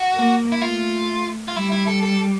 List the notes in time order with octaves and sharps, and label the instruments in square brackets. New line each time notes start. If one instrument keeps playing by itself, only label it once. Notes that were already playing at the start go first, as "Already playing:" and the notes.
Already playing: [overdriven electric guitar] F#4
[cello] A#3
[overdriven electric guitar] E4
[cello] A3 [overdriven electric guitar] F4
[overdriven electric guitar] F4
[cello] G3 [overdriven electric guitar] E4
[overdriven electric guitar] E4
A4
A4